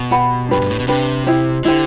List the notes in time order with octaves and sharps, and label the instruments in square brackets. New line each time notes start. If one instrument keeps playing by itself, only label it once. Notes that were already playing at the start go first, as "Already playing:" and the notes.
Already playing: [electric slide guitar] B2
[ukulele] G4 B4 F#5 B5
[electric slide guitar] F#2 [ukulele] D4 G4 B4
[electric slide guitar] G2
A2
B2
[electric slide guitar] C3 [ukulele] D4 G4 B4
[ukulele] E4 G4 C5
[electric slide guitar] D3 [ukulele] E4 G4 C5